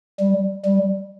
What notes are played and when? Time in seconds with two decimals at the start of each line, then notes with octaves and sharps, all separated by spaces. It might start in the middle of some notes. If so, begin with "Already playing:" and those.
0.20 G3
0.65 G3